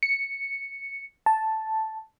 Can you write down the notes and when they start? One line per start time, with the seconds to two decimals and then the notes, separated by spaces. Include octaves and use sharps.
0.03 C#7
1.26 A5